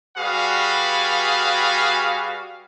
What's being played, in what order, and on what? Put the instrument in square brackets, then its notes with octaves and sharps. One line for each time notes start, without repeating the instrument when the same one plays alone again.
[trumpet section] G3 F#4 G#4 B4 F5